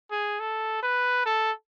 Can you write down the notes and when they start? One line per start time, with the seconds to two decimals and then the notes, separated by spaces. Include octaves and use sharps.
0.11 G#4
0.40 A4
0.83 B4
1.26 A4